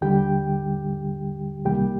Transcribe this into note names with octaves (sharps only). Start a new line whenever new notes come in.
D#2 D3 G3 G4 G5
C2 C3 D#3 G3 A#3 G4 G5